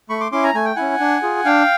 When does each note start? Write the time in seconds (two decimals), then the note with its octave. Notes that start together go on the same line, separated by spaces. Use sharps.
0.09 A3 B5 C#6
0.21 C6 D6
0.32 C#4 E4 C6 D6
0.43 G#5 A#5
0.54 A3 G#5
0.65 G5
0.76 C#4 E4 F#5 G#5
1.00 D4
1.22 F4 G#4
1.45 D4 F5 G5